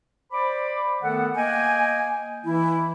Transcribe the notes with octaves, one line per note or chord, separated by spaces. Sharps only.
C5 D5 B5 D6
D#3 A3 B3 A4 F#5
A#3 D#5 G5 G#5
E3 E4